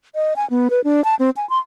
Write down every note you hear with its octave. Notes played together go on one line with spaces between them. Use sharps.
D#5
G#5
B3
B4
D4
A5
C4
G#5
C6